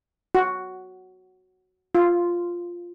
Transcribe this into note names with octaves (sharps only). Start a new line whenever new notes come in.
F#4
F4